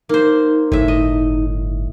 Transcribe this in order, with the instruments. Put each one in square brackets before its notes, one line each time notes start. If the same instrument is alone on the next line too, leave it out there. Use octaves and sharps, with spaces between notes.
[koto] A#3 C5 [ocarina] D#4
[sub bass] G1 [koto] A2 E5
[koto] D#5